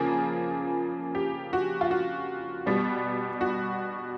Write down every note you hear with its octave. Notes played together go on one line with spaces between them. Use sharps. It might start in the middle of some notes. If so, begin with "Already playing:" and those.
Already playing: C#3 F3 A#3 G#4
G4
F#4
F4
F#4
B2 G3 B3
F#4